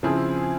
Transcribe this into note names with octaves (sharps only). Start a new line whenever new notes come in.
C#3 F3 C4 E4 G#4